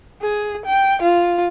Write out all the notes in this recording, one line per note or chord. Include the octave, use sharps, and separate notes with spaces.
G#4
G5
F4